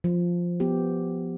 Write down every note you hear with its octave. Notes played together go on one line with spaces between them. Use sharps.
F3
B3 G4